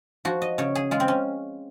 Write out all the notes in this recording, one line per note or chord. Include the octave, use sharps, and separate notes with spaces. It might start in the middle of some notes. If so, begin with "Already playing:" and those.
F3 F#4
D#5
C#3 C#5
G#4
G#3 F4
C4
C#4